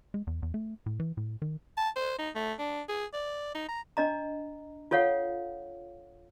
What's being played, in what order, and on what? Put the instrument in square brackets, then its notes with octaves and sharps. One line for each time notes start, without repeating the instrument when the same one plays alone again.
[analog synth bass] G#3
E2
E2
A3
A2
E3
A2
D#3
[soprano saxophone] A5
C5
D#4
A3
D4
G#4
D5
D#4
A#5
[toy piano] D4 D#5 A#5
F4 A4 C#5 F5 F#5